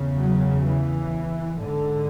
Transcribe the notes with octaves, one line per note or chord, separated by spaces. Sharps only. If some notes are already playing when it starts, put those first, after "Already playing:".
Already playing: E2 C#3
F#3
E3
G#2 D3